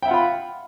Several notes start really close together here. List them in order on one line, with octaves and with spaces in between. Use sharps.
G5 E5 F#5 F4 B5